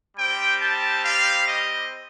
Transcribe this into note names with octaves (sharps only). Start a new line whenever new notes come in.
G3 C4 G4 G5
A5
F5
D#5